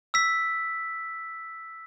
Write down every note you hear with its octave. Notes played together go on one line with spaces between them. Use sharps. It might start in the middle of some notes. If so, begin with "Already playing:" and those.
E6 B6